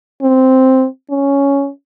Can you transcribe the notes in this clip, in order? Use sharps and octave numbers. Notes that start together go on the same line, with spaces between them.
C4
C#4